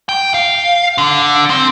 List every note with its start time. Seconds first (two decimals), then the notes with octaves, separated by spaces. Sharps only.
0.09 G5
0.34 F5
0.98 D3
1.50 C4